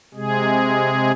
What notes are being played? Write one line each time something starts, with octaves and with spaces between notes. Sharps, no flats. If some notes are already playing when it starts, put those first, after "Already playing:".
C3 G#3 G#4